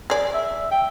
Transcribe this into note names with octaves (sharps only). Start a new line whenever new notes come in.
G#4 D5
E5
G5